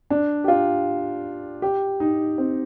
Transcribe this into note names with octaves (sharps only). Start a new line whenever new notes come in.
D4
G4
F4
G4
D#4
C4